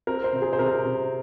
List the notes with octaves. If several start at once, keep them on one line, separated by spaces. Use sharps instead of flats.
C4 A#4
C5
C3
G#4
C5
C3 A#4
C3